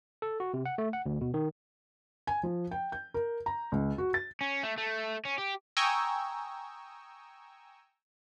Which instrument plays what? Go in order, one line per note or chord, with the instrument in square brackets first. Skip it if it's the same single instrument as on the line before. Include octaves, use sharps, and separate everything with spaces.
[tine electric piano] A4
F#4
C3
F#5
A3
F#5
D2
B2
D#3
[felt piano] G#5
F3
G5
G6
A#4
A#5
C#2
F#4
A6
[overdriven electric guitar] C#4
A3
A3
C#4
G4
[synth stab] G5 G#5 A#5 C#6 D#6 E6